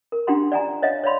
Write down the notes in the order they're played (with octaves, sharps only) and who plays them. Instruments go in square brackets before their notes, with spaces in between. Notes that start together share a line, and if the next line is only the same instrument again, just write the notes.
[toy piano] A#4
D4 F4 G4 F#5 C6
D5 F#5 G#5 A#5
C#5 D#5 F5 F#5
C#5 D5 F5 B5 C6